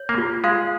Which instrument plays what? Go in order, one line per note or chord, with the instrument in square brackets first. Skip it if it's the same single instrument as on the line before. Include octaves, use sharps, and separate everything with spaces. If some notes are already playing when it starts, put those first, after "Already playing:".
Already playing: [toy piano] C#5
[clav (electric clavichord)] A#3
[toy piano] F4
[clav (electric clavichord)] G#3 [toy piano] F5